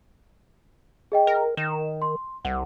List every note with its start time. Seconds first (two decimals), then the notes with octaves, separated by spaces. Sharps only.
1.12 G#4 D#5 G5
1.27 A#4
1.57 D#3 E7
2.02 C6
2.45 C2 F#5